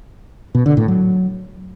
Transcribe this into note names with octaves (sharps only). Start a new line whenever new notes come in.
B2
D3
A2
F#3